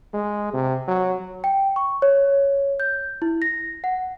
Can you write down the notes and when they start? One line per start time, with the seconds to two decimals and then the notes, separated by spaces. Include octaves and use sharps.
0.13 G#3
0.54 C3
0.88 F#3
1.44 G5
1.76 C#6
2.02 C#5
2.80 G6
3.22 E4
3.42 A#6
3.84 F#5